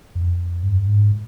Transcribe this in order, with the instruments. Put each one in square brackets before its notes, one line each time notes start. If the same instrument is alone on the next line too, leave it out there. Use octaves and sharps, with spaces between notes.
[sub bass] F2
G2
G#2